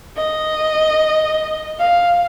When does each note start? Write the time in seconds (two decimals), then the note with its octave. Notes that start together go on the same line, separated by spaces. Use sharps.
0.16 D#5
1.79 F5